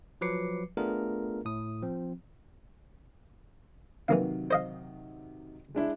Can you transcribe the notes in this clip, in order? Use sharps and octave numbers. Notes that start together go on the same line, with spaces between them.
F3 F#3 B4 D6 C7 C#7
A3 B3 D4 F4 G#4 A#4
A2 D#6
F3 C4
C3 D#3 E3 F#3 A#3 F5
C5 D#5 F5
G#3 D4 E4